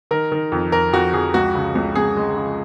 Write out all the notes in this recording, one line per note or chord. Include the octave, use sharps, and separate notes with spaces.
D#3 A#4
D#3
F2
F2 A#4
F2 F#4
F2 G#4
C#2 F#4
C#3
C#2
C#2 G#4
G#3
C#3